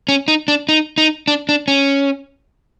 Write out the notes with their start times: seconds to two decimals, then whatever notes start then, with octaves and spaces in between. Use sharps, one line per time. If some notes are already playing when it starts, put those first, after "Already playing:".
0.09 C#4
0.28 D#4
0.48 D4
0.69 D#4
0.98 D#4
1.28 D4
1.49 D4
1.68 C#4